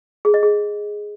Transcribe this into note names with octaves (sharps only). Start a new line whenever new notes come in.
G#4
D#5
G#4